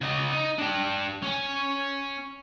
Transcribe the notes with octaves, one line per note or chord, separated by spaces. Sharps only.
C#3 D#5
D#4
D4 G4
C#4 G#5